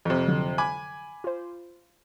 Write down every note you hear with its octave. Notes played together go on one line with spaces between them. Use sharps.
F2 C3 A#5
D3 F3 F#3
G#5 B5 D6
F4 C5